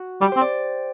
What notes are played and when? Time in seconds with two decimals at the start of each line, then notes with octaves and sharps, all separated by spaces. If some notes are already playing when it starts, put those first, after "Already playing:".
Already playing: F#4
0.21 G3 G4
0.32 C4 C5
0.41 D5